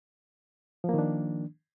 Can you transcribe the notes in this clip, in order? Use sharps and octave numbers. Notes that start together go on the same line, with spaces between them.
D#3 F3 A#3 D4